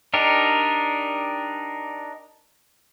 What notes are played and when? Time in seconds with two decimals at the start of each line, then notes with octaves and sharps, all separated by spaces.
0.14 D4 D#4 G4 A#4